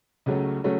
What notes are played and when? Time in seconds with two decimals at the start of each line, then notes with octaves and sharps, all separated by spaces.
0.26 C#2 C#3 F#3 A3 C#4
0.64 C#3 F#3 A3 C#4